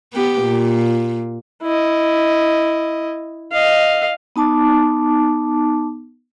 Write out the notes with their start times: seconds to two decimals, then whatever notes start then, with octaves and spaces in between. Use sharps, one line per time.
0.13 B3 G4
0.42 A#2
1.63 E4 D#5
3.52 D#5 F5
4.36 B3 D#4 A5 D6